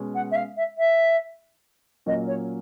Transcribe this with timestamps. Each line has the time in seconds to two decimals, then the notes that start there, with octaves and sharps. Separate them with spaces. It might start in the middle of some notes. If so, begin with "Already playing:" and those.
Already playing: B2 G#3 C#4
0.14 F#5
0.31 E5
0.36 F5
0.56 E5
0.78 E5
2.06 A#2 F#3 A#3 C#4 D#5
2.27 C#5